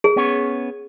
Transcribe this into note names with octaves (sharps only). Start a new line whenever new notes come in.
G#4
B3 C#4 C#5